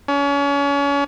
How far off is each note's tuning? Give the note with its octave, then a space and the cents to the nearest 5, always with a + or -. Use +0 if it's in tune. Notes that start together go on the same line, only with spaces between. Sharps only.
C#4 +35